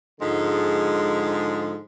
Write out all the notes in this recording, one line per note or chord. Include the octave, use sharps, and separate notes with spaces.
G#2 D3 F3 G#3